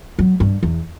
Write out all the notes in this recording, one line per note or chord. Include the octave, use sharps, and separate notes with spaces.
F#3
G2
E2